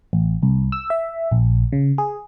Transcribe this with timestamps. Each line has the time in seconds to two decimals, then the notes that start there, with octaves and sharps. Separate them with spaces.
0.13 A1
0.43 C2
0.72 E6
0.90 E5
1.31 A#1
1.72 C#3
1.98 G#4